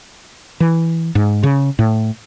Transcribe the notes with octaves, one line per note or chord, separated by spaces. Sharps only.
E3
G#2
C#3
A2